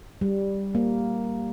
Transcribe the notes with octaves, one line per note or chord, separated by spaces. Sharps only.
G3
A#3